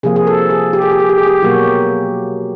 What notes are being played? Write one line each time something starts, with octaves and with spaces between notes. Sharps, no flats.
C3 F3 A#3 G#4
G#4
A4
G#4
G4
G#4
G4
G#4
G4
G#4
G4
B2 F#3 A#3 F#4